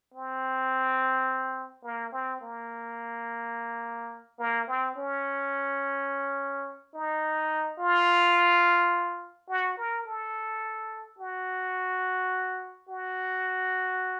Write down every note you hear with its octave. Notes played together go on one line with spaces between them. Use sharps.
C4
A#3
C4
A#3
A#3
C4
C#4
D#4
F4
F#4
A#4
A4
F#4
F#4